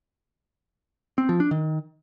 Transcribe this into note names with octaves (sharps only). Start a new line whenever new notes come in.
C4
F3
D4
D#3